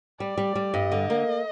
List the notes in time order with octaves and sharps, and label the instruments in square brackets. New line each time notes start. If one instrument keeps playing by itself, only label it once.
[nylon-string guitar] G3 [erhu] D5
[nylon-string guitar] G3
G3
[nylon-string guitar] G2 [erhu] D#5
[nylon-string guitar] D3
A#3